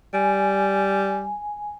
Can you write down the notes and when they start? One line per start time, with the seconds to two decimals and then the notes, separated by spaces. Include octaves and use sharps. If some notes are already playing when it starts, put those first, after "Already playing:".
0.14 G3 G#5